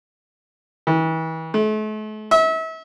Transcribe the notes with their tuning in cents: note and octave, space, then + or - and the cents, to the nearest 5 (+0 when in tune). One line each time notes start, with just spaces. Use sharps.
E3 -35
A3 -40
E5 -35